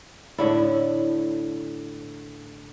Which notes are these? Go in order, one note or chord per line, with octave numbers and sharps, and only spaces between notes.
A2 D3 E4